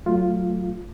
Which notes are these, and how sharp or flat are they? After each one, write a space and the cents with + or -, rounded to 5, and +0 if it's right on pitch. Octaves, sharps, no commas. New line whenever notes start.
F#3 +0 A3 +0 F4 +0